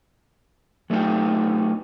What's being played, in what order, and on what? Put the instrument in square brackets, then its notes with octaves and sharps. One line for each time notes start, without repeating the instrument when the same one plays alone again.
[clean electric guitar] F#3 A3 B3 D#4 G4